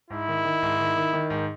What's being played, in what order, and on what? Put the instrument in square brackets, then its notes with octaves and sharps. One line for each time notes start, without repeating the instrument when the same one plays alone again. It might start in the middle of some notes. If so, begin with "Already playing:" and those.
[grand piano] G#2 [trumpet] E4
[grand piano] D#3
D#3
G#2
D#3
D#3
D#3
G#2